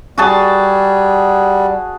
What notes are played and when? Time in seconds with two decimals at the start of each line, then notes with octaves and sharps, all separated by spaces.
0.18 G3 F#4 G#4 A5